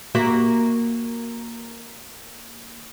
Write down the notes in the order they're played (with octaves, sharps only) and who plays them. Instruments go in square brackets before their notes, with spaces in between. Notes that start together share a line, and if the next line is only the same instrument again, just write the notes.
[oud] A#3 F#4 E5